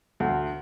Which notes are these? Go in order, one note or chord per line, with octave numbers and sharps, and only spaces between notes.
D2